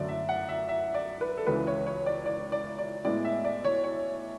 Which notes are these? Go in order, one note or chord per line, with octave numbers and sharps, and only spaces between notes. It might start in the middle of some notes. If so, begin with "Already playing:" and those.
Already playing: F#2 D3 F#3 A3 D5
E5
F#5
E5
E5
D5
B4
A4
C#2 C#3 E3 B4
C#5
C#5
D5
D5
D5
D5
A2 G#3 B3 D5
E5
D5
C#5
C#5